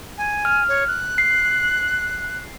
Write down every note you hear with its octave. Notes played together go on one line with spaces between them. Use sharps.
G#5
F6
C#5
F#6
C7